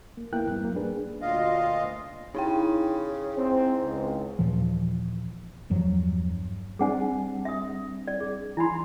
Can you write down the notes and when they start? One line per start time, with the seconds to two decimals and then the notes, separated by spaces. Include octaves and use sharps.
0.17 A#3
0.33 D2 A#3 B3 E4 G5 F#6
0.47 E2 G#2 G3 B3
0.63 F#3 A#3
0.76 A#3 D4 G#4 B4
1.21 D2 A#2 F4 D#5 F5
2.35 C#3 D#4 E4 G5
3.37 G#2 C4
3.82 C#2
4.39 D#2 A#2 E3 F3
5.70 E2 G2 F3 F#3
6.79 G3 C4 D4 G#4 F#5 G#5
7.45 E5 D#6
8.07 D5
8.20 G#4
8.57 E3 E4 G#5 B5 C6